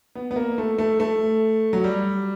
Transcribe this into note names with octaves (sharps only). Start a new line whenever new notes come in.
B3
B3
A#3
A3
A3
A3
F#3
G3